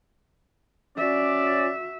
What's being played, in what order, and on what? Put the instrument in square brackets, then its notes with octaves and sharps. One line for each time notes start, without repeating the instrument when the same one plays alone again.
[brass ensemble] C#4 D5 [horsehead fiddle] F#4 E5